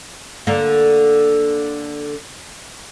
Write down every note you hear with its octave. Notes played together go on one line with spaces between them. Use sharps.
D3 A#3